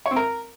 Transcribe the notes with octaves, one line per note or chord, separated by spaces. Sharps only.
C#5
C4
A#4